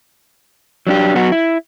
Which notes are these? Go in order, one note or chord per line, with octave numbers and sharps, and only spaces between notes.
F#3 D4 G4
F#3 B3 F#4
E4